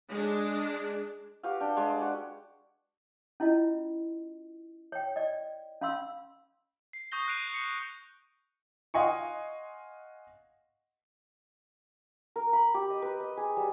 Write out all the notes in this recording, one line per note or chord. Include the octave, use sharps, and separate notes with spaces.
G#3 D4
F#4 G4 B4 F5
D4 G5
G#3 D5 B5
G5
F#4 B4
C#4 E4 F4 D#5
C#5 G5
D5 D#5
C#4 F5 B5 C6 E6
C7
C#6 D#6 G6 A#6 G7
F#6 A#6 C7 D7 D#7 F7
C#7
D#5 F5 F#5 G#5 C6 C#6
A#4
B5
G4
D#5
B4
D#5
G#4
G3